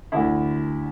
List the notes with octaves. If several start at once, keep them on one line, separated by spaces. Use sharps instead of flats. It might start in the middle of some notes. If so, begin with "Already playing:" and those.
D2 D3 E4